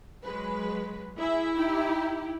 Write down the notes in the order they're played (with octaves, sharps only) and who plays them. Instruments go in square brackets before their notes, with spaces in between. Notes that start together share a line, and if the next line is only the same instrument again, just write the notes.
[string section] F#3 G#3 B4
[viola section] E4 [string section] G#4 E5
[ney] D#4 [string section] G4